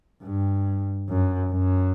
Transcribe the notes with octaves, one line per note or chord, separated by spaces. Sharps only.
G2
F#2
F#2